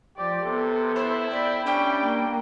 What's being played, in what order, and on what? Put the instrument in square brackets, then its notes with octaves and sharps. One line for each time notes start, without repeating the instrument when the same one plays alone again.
[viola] F3 D5 [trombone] G4
[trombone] C3 [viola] B3 A4
[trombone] E4 [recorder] C5
[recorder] D5 [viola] G5 B5
[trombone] G3 [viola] C#4 D4 [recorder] G5
[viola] A#3